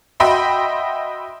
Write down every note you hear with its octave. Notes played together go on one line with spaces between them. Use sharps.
F#4 D#5 E5 G5 B5 C6